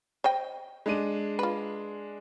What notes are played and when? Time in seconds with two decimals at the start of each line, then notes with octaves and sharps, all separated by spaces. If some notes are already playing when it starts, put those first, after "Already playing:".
0.24 C5 D#5 G5
0.86 G#3 D4 D#7
1.39 F4 B4